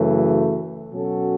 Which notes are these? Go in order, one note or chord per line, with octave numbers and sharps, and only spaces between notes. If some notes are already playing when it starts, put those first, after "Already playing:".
Already playing: F#2 C#3 E3 A3
B2 F#3 C#4 F#4 A4